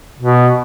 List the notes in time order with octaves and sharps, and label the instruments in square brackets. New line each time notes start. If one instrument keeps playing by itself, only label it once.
[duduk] B2